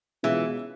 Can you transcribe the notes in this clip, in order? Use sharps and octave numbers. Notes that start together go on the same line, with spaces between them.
B2 E3 G#3 C#4 F4